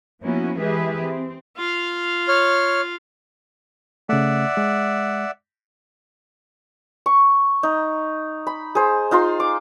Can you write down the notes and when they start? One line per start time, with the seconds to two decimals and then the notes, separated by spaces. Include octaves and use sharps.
0.22 F3 A#3 B3 C#4 E4 F#4
0.59 E3 G#3 G4 G#4 B4 E5
1.00 C4
1.56 F4 F5
2.28 C#5 F6
4.09 C#3 A3 D5 E5 F#5
4.57 G#3
7.06 C#6
7.63 D#4
8.47 B5
8.75 G#4 C5
9.11 D#4 F4 A#5 C6
9.40 D6